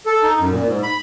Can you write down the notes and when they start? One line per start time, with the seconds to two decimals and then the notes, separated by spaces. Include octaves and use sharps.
0.06 A4
0.23 D#4
0.39 F#2
0.51 A#2
0.66 G#2
0.83 B5